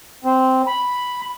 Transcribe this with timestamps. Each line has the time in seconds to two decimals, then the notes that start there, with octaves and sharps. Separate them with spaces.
0.24 C4
0.67 B5